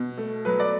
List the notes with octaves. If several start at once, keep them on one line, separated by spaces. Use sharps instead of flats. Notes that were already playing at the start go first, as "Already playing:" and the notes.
Already playing: B2
A3
F#3 B4
D5